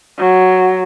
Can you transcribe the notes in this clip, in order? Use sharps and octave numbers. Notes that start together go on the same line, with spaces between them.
F#3